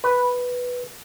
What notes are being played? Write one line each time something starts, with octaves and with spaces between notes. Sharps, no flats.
B4